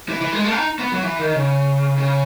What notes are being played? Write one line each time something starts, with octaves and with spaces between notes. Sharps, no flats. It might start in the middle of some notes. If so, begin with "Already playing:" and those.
E3
E3
G#3
A3
D#4
B3
F#3
E3
D#3
C#3
C#3